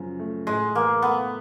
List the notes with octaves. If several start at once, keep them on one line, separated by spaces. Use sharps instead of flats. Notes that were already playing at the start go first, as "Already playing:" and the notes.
Already playing: F#2 C#3 F3
A3
A2 G#3
E3 A#3
A3 B3